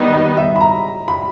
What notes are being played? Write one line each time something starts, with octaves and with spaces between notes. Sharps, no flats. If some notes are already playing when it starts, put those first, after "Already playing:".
Already playing: D#3 G3 B3 D#4 D#5
D#5
E5
B5
A#5
B5